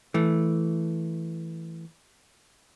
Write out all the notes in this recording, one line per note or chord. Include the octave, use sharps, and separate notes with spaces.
E3 A3